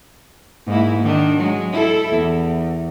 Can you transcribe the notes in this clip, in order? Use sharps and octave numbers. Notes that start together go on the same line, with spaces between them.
G#2 A#3 E4
D#3 D4
F#3 G#3
E4 A4
E2